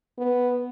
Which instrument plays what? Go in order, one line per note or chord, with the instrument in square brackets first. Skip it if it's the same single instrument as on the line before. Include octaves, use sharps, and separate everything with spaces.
[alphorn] B3